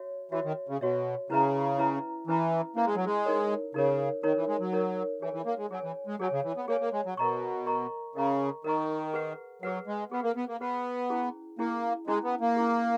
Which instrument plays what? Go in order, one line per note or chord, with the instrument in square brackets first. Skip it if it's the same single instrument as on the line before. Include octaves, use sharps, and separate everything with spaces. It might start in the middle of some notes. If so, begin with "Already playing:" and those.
Already playing: [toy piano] F#4 C#5 E5
[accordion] E3 [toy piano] F#4 C#5 E5
[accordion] D#3
C#3
[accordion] B2 [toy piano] F#4 C#5 E5
[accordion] C#3 [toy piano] C#4 E4 B4 E5 A#5
[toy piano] C#4 E4 B4 E5 A#5
[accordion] E3 [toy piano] C#4 E4 B4 E5 A#5
[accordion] A#3 [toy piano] C#4 E4 B4 E5 A#5
[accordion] G#3
F#3
G#3
[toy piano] D#4 A#4 C#5
[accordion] C#3 [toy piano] D#4 A#4 C#5
[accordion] D#3 [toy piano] D#4 A#4 C#5
[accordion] E3
G#3
F#3
[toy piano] D#4 A#4 C#5
[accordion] E3 [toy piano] G#4 C#5 G#5
[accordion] E3
A#3
G#3
[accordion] F#3 [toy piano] G#4 C#5 G#5
[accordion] E3
G#3
[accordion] F#3 [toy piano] G#4 C#5 G#5
[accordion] C#3
E3
B3
[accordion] A#3 [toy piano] G#4 C#5 G#5
[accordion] A#3
G#3
F#3
[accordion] B2 [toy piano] A#4 D#5 A#5 C#6
[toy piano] A#4 D#5 A#5 C#6
[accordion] C#3 [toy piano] A#4 D#5 A#5 C#6
[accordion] D#3 [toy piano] A#4 D#5 A#5 C#6
[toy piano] G#4 B4 F#5
[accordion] F#3 [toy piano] G#4 B4 F#5
[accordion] G#3
[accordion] B3 [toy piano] G#4 B4 F#5
[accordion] A#3
B3
A#3
[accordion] B3 [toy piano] G#4 B4 F#5
[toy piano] C#4 E4 G#4
[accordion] A#3 [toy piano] C#4 E4 G#4
[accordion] G#3 [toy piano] C#4 E4 G#4
[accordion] B3
A#3
[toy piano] C#4 E4 G#4